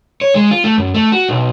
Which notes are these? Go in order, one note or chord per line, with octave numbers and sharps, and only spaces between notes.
C#5
G#3
F4
A3
F#2
A3
F#4
B1